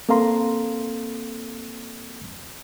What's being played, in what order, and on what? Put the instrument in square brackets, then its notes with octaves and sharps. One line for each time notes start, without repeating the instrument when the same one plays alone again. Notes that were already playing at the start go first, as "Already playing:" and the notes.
[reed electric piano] A#3 C4 A4 F5 A#5 C6